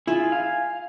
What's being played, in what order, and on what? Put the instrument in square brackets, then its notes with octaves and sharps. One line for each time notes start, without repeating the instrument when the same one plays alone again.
[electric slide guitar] E4 [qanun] F4 G#4 E5 [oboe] G#5
[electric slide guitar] F5